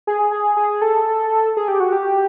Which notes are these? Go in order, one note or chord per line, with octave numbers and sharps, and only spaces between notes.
G#4
G#4
G#4
A4
G#4
G4
F#4
G4